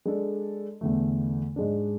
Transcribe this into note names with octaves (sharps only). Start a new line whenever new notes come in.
G#3 D4 A4
E2 D3 A3
G#2 G#3 D4